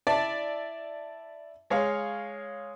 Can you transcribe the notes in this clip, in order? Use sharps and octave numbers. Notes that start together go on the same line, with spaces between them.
E4 D5 E5 A5
G#3 C#5 F5